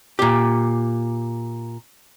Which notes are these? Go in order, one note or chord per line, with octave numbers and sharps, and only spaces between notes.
A#2 G4